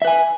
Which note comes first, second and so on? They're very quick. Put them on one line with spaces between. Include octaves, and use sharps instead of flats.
E5 B4 G#5